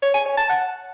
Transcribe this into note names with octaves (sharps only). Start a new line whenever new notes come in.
C#5
G#5
C#5
A5
F#5